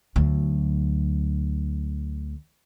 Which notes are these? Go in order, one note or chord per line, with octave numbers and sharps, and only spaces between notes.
D2 F#3